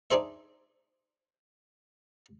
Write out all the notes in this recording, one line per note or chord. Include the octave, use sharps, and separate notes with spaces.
D4 D#4 G#4 C5 E5